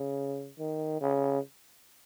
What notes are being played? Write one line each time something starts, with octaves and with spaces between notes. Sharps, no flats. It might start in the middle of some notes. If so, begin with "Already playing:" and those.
Already playing: C#3
D#3
C#3